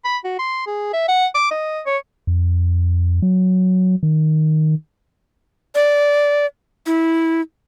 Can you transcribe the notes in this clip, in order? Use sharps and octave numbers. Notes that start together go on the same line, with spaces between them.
B5
F#4
C6
G#4
E5
F#5
D6
D#5
C#5
F2
F#3
D#3
D5
E4